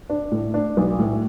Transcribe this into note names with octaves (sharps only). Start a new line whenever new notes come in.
D4
A2
D4
B1
A2